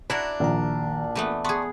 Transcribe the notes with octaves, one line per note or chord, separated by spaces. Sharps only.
D4 E4 F#4 A#4
A#1 D#3 A#5
E3 A3 B3
B3 G#4 A5 C6 C#6